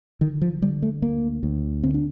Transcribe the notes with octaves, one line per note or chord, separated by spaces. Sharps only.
D3 D#3
F3
D3 G3
A3
D2 A#3
D2
D3 C4
D4